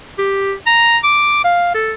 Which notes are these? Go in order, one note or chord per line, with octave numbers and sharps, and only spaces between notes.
G4
A#5
D6
F5
A4